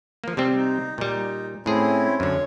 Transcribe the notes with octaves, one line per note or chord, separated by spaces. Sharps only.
F3 A#3
C3 G3 C4
D#4
A#2 G3 D#4
A2 C4 C#4 E4 G#4
F#2 D3 C#5